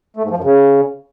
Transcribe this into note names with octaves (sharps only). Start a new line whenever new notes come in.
A3
G#2
F3
F#2
C#3